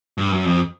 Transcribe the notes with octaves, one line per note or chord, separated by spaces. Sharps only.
G2
F#2
F2